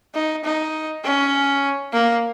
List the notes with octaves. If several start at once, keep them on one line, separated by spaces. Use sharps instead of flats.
D#4
D#4
C#4
A#3